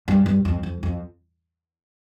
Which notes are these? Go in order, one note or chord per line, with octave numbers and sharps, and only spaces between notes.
G2
G2
F2
F2
F2